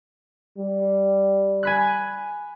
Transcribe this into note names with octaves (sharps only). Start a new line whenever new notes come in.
G3
G#5 B5 F#6